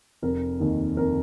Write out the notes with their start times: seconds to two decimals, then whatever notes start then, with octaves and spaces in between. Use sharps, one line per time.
0.22 F1 A#4
0.60 D#2 D#3
0.97 F1 A#4